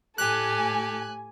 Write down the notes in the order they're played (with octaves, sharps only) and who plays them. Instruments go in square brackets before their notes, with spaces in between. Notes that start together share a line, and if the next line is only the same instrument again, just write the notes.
[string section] A2 G#5 [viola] G4 [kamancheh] A4 [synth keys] F#6